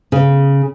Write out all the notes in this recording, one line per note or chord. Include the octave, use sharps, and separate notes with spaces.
C#3